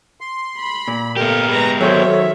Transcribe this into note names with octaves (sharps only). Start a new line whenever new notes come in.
C6
B5
A#2
A3 B3 G4 A#4 F5
G#3 B4 A#5
D#3 F#3 G#4 A4 C5 C#5 E5